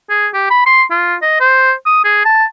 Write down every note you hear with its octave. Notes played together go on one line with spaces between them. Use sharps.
G#4
G4
B5
C6
F4
D#5
C5
D#6
G#4
A5